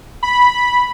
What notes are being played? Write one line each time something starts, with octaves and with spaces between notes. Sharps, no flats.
B5